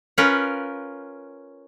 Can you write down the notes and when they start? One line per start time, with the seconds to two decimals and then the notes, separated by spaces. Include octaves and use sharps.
0.18 C#4 F4 A#4 B4